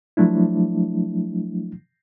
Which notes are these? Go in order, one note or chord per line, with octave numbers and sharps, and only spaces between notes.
F3 F#3 A3 D4 E4